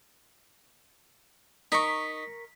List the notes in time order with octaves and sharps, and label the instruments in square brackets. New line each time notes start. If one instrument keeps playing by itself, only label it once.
[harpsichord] D#4 [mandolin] A#4 C#6 [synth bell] B6